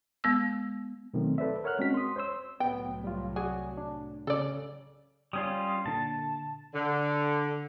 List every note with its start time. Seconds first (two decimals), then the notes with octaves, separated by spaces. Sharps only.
0.24 G#3 B3 E6
1.14 B2 D#3 F#3 A3 C4
1.38 A4 B4 C5 D5 E5
1.64 A#4 C#5 F#5 F6 F#6
1.79 G#3 C4 C#4 F#4 B6
1.94 C6 D#6
2.16 C5 C#5 C6 E6
2.60 C2 A2 F#3 B3 G5
3.04 G3 F4
3.36 F#4 G#4 D5 G#5
3.77 D4
4.27 C#3 C#4 A4 D5
5.33 G3 C#4 F4 D#6
5.86 A#2 D3 A5
6.74 D3